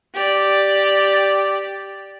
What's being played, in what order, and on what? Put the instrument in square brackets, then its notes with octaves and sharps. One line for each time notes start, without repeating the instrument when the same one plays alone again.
[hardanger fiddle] G4 D5